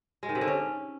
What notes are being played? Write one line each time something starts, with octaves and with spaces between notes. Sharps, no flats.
G#3
D#3
C3
D3
C#4